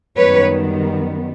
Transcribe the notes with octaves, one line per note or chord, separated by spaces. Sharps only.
F#2 D#3 G3 B3 B4 C#5